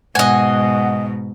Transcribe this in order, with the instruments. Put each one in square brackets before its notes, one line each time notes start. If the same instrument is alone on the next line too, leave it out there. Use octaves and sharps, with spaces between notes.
[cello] G#2 B2 [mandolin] D#5 G#5 [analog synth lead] F#5